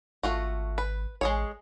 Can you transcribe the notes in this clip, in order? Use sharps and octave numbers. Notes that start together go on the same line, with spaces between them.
G#1 A3 F4 F#4
B4
A1 G#3 G#4 C#5